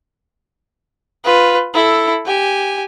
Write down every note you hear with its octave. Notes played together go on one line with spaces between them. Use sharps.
F4 B4
E4 A4
G4 G#5